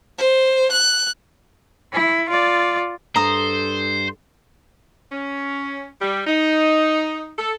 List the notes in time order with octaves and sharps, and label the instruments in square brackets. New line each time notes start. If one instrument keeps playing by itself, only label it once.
[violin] C5
F#6
[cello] E4
F4 D5
[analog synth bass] G2 [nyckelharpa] A4 [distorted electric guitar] C5 [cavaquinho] A#5 D#6
[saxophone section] C#4
G3
D#4
A4